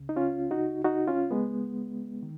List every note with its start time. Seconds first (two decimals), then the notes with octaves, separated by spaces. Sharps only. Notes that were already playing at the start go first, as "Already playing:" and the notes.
Already playing: C#2 C#3
0.09 D#4
0.16 C#4 F4
0.51 D#4 F#4
0.85 D#4 F#4
1.08 C#4 F4
1.31 G#3 B3
2.23 D#3